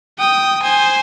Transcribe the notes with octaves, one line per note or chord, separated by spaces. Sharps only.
G5 D#6
C5 G#5